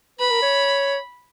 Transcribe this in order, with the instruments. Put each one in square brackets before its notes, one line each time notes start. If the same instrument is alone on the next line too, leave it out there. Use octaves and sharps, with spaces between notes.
[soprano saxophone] B4 [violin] B5
[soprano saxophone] A#4
C#5